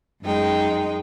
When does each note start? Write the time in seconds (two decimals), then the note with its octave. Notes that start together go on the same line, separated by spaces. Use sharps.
0.22 F#2 G#3 D#4 G5